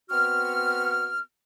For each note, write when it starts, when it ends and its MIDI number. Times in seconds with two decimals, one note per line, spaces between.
0.10 1.20 59
0.10 1.20 60
0.10 1.20 66
0.10 1.20 89